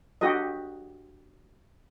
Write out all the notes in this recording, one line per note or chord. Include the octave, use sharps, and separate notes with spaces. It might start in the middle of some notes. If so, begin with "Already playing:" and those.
D4 F#4 G4 A4 D#5